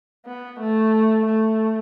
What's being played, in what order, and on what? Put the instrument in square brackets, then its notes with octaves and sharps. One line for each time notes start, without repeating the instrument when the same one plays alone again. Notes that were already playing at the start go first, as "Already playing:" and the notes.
[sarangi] B3
A3
A3